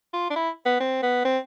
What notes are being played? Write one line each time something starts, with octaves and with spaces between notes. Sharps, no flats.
F4
D4
E4
B3
C4
B3
C4